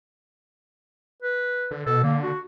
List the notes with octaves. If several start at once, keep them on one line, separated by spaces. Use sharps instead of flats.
B4
D3
B2 A4
D3 A#3
F#4